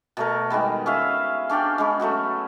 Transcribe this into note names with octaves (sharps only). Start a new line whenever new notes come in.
B2 A3 A#4
D#3 G3 G#3 B3
C#4 G#4 E5 F5
C#4 D4 D5 G5
G#3 C#4 B5
F#3 A3 C#4 F#4